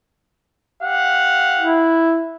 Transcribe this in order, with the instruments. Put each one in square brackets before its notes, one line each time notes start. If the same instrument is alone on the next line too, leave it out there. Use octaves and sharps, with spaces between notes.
[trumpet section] G4 F5 F#5
[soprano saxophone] E4